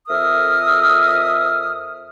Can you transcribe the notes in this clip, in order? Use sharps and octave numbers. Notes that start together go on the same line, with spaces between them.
F2 A4 A#4 E5 D#6 F6